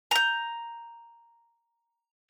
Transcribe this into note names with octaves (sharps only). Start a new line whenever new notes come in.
A#5 G6